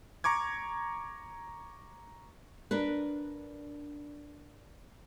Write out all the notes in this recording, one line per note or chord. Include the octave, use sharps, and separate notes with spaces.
A#5 C#6 D6 G#6
D4 A#4 B4